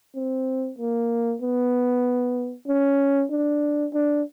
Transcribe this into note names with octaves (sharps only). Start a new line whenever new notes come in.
C4
A#3
B3
C#4
D4
D4